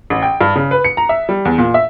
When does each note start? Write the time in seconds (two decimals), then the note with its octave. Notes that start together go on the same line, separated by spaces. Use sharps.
0.10 A1
0.22 G5
0.41 G2
0.55 C#3
0.71 B4
0.85 C#7
0.97 A#5
1.09 E5
1.29 G3
1.45 E2
1.58 A#2
1.74 E5